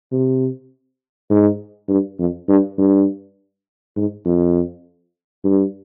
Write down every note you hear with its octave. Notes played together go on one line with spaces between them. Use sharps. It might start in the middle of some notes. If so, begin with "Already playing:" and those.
C3
G#2
G2
F2
G2
G2
G#2
F2
G2